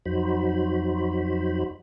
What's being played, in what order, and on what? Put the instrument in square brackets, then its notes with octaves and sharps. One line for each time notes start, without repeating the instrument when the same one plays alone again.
[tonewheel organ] F2 F#3 D#4 F#4 C5 B5